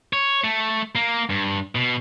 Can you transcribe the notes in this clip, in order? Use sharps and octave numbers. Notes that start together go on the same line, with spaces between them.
C#5
A3
A#3
G2
B2